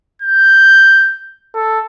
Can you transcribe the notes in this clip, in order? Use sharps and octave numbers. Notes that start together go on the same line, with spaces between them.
G6
A4